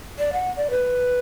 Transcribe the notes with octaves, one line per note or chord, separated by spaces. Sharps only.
D5
F#5
D5
B4